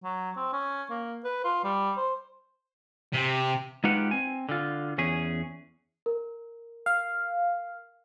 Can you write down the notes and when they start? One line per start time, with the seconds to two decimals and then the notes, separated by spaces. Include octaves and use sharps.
0.04 F#3
0.37 C4
0.53 C#4
0.90 A#3
1.24 B4
1.44 F4
1.64 G3
1.97 C5
3.13 C3
3.84 G#3 D#4 F4 G4 B4 F#5
4.11 C4 G#5
4.49 D3 F4
4.98 E2 C#4 G#4
6.06 A#4
6.86 F5